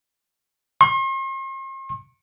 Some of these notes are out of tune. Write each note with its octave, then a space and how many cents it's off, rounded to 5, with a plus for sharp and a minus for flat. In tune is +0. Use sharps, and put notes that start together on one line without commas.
C6 +45